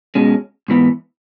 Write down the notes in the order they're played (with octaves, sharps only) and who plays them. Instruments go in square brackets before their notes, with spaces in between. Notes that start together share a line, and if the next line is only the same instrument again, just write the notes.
[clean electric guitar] B2 G#3 C#4
G#2 E3 B3